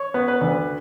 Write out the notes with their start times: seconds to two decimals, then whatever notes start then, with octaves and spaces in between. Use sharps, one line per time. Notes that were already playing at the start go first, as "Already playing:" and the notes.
Already playing: C#5
0.14 B3
0.28 B4
0.41 D2